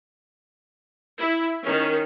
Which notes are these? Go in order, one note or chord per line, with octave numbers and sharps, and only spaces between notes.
E4
D#3 C#4